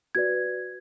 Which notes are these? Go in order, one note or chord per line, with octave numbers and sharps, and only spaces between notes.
F#4 B4 D5 G#6